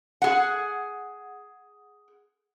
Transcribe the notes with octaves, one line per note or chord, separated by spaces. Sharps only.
G#4 F#5